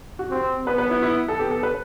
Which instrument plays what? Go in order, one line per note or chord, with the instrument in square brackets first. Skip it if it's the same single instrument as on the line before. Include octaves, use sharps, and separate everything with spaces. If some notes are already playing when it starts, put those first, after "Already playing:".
[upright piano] F#4
[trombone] C4 [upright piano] G4
[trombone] B3 [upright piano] B4
[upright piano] B4
E4
E4
A4
[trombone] B3 [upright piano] G4
[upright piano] A4
B4